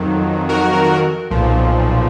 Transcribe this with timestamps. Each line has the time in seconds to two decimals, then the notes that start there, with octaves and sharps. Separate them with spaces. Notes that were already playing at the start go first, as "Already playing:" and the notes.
Already playing: F2 D#3 F#3
0.49 F#4 A#4
1.31 B1 A#2 F3